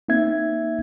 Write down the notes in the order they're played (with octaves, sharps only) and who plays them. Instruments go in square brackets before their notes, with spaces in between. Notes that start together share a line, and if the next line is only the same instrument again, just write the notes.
[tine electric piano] A#3 C4 D#4 E5 G#6